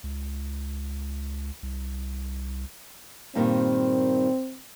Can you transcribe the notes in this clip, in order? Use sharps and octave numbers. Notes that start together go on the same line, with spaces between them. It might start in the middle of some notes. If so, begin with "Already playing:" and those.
C#2
C2
G2 A#2 D#3 C4